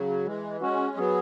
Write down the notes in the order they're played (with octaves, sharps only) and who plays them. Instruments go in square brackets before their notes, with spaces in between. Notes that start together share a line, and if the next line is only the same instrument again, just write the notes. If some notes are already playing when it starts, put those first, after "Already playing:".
Already playing: [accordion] C#3 F#3
E3 G#3
[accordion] G#3 C#4 [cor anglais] F#4
[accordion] F#3 B3 [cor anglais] G#4